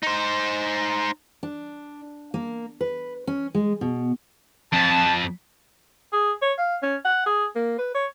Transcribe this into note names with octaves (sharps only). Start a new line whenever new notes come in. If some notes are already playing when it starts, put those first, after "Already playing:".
D#4 C5
D4
A#3
B4
C#4
G#3
B2
F2 A5
G#4
C#5
F5
C#4
F#5
G#4
A#3
B4
C#5